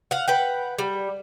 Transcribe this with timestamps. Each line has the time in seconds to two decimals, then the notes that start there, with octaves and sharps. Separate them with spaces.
0.11 F5 F#5
0.28 B4 F#5 G5
0.78 G3